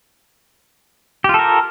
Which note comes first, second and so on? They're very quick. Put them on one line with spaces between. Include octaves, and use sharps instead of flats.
G4 F4 A4 A#4